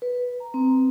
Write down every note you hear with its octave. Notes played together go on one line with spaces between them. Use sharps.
B4
A#5
C4